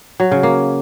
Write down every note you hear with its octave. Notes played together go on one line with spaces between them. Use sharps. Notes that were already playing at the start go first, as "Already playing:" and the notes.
F#3
C#3
A#3